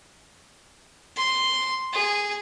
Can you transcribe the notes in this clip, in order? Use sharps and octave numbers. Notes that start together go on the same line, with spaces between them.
C6
G#4